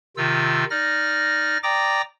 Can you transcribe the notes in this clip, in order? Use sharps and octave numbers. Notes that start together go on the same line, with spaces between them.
C3 D#3 F4 E6
D#4 D5 F6 A#6
D5 G5 A#5 D6 D#6 A#6